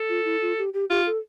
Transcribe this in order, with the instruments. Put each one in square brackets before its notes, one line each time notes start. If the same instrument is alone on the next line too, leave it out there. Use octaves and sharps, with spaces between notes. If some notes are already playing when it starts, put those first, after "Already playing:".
Already playing: [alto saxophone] A4
[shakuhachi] F4
E4
F4
G4
G4
[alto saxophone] F4 [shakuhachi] G4
[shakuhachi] A4